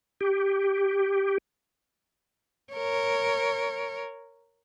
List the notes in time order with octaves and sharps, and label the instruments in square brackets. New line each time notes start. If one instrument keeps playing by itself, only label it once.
[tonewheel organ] G4
[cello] A#4 C#5